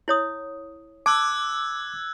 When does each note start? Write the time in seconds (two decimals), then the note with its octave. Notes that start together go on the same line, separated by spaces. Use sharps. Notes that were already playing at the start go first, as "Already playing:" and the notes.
0.08 E4 C#5 D#6
1.06 A5 D6 E6 F#6 G#6